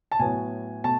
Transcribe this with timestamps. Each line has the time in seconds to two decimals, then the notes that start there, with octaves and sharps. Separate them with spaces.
0.11 A5
0.19 A2 F#3 B3 G#5
0.84 B2 A3 A5